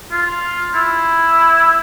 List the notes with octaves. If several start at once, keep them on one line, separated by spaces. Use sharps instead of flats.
F4
E4